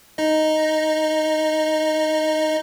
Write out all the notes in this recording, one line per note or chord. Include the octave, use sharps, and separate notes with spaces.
D#4 D#5